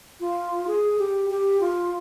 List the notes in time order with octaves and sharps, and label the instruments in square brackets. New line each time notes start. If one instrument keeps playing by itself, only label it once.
[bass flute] F4
G#4
G4
G4
F4